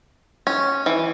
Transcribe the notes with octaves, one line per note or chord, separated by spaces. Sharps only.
C#4
E3